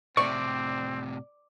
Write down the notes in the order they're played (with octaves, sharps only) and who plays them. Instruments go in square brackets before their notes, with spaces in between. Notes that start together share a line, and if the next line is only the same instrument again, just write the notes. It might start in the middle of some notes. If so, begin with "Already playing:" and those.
[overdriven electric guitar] A2 C3 [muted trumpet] C4 [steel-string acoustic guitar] D5 [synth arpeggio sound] C#6